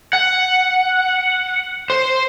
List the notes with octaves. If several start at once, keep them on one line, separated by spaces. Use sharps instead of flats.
F#5
C5